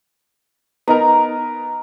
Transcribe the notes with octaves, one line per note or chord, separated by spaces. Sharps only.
B3 D#4 A#4 A#5